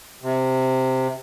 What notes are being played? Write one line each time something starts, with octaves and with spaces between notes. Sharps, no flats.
C3